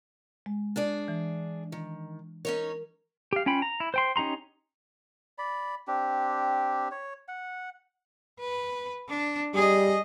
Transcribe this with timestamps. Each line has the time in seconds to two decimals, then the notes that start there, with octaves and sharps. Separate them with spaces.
0.46 G#3
0.76 D4 G#4 D5
1.08 E3
1.72 D#3
2.45 C#4 D#4 A#4 C#5
3.33 G4 F5
3.46 C#4 F4 G5 B5
3.62 A#5
3.80 E4
3.94 C5 G5 C6
4.16 C#4 D#4 G4 A#5 C6
5.38 D5 B5
5.87 C4 D4 G4
6.92 C#5
7.28 F#5
8.40 B4
9.08 D4
9.55 G3 G#4 D#5